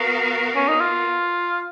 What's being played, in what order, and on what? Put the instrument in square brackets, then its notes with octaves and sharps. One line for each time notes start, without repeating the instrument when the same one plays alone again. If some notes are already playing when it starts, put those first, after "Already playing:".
Already playing: [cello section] B3 F#4 A#4 F5
[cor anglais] C#4
D#4
F4